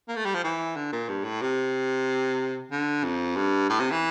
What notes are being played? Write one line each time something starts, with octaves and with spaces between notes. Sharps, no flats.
A#3
A3
G3
F3
E3
D3
A#2
G2
A2
C3
D3
F2
G2
A2
C3
E3